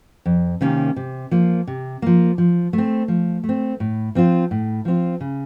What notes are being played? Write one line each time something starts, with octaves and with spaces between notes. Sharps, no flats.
F2
C3 D#3 A#3 C#4
C3
F3 A#3
C3
F3 A#3
F3
A3
C4
F3
A3
C4
A2
F3 C4 F4
A2
F3 C4 F4
C#3